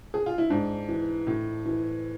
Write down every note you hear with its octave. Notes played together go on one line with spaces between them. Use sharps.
G#4
F4
E4
G#2 D4
E3
A2
E3